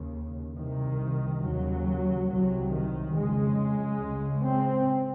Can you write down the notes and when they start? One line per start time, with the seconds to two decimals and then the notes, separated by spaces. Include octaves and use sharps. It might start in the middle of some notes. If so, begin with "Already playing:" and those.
Already playing: D#2 C#3
0.57 C2 C3 D#3
1.42 D#2 C#3 F#3
2.28 C2 C3 F#3
2.71 D#3
3.15 F2 C#3 G#3
4.01 C#2 C#3
4.43 C4